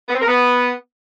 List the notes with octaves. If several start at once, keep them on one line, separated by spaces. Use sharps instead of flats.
B3
C4
A#4
B3